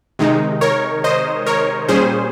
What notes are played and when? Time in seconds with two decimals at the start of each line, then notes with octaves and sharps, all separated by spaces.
0.19 C3 D#3 G#3 D#4
0.61 A#4 C#5
1.04 C5 D#5
1.46 A#4 C#5
1.89 A#2 G3 C#4 G#4 C5